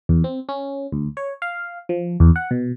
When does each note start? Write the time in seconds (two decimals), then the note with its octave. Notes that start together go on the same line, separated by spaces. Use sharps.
0.09 E2
0.24 C4
0.49 C#4
0.92 D2
1.17 C#5
1.42 F5
1.89 F3
2.20 E2
2.36 F#5
2.51 B2